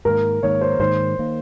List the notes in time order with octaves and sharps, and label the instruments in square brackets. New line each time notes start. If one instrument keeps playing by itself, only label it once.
[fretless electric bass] G#2 D#3 A#3 [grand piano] A#4
[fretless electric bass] G#2 D#3 A#3 [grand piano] C#5
[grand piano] C5
[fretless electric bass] G#2 D#3 A#3 [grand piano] C5
[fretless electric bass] D#3 A#3